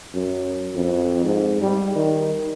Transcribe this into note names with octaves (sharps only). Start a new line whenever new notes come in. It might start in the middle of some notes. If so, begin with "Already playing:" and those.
F#2
F2
G#2
G3
D#3